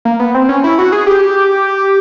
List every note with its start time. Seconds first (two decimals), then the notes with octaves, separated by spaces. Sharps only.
0.05 A#3
0.20 B3
0.34 C4
0.49 C#4
0.64 E4
0.78 F#4
0.92 G#4
1.07 G4